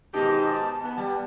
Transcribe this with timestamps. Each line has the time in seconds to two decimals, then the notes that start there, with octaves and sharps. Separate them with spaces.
0.14 G#2 B2 D#3 D#4 G4 A5
0.84 B3
0.97 G3